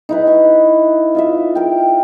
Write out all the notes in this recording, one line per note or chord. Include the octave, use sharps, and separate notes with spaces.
D#4 E4 B4
C#6
F4 D#5 E5
A#4 G5